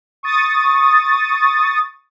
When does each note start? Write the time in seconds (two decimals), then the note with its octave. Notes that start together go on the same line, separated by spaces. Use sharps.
0.23 C#6 D#6 A6